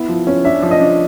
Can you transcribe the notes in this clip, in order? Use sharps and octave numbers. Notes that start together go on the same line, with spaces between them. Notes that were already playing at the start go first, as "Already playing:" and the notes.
Already playing: B3 E4
F3
C#4
D4 E5
F3
D#5
D4